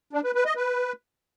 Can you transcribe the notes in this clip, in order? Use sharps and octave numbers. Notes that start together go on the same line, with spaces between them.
D4
B4
B4
D#5
B4